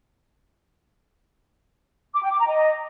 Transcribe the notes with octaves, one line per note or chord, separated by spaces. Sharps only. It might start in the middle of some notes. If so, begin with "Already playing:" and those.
D6
G5
D6
A#5
D#5